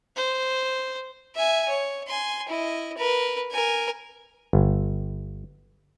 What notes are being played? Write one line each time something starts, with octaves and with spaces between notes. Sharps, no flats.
C5
E5 G#5
C#5
G#5 C6
E4 D#5
A#4 B4
A#4 G#5
G1